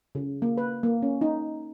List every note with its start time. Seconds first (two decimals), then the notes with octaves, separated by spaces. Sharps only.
0.15 C#3
0.42 A#3
0.58 B4
0.83 A#3
1.02 C#4
1.21 D#4